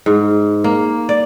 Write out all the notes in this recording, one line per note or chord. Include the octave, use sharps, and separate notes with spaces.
G#2
A#3
D5